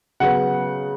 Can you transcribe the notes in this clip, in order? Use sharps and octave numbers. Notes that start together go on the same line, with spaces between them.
C#3 F#3 B3 F#5